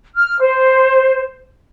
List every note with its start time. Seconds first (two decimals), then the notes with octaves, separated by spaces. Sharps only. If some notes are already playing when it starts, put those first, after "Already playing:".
0.15 F6
0.40 C5